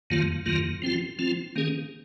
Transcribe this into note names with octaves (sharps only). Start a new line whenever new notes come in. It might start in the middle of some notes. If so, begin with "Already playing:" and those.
F2 D#3 F#3 A#3 F4
F2 D#3 F#3 A#3 F4
F3 C4 F4
F3 C4 F4
D#3 A#3 C#4 G#4